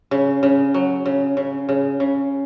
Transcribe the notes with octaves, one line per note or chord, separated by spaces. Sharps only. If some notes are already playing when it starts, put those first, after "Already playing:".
C#3
C#3
F#3
C#3
C#3
C#3
C#3